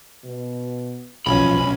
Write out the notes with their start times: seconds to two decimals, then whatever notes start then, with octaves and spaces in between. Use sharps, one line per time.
0.24 B2
1.26 B1 F3 C#4 B5